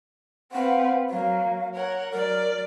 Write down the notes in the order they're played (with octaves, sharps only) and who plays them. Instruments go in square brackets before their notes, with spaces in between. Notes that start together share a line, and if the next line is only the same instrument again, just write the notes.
[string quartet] C4 B4 F5 [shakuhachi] F#5
[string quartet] F#3 A#3 [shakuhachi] F5
[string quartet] A#4 F#5 [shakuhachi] C#5
[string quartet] F#3 D5 [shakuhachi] A#4